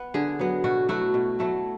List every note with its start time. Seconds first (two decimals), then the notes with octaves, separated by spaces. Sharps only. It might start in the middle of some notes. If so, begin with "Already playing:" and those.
Already playing: B3
0.14 D3 G#4
0.39 F#3 B3
0.64 B2 F#4
0.89 F#3 A3 E4 F#4
1.14 B2
1.39 F#3 A3 E4